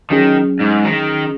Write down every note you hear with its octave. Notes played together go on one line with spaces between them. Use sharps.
D#3 F#3 C#4 G#4
G#2
D#3